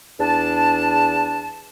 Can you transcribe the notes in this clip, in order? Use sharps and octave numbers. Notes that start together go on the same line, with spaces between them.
E2 D4 A5